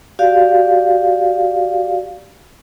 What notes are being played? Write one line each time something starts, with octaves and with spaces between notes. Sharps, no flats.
F#4 G4 D5 F5